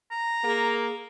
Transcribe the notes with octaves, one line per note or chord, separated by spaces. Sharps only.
A#5
A#3 G#4